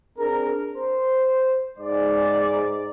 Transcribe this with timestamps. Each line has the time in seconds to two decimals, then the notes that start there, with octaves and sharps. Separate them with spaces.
0.18 C4 D4 G#4 A#4
0.75 C5
1.79 G#2 D5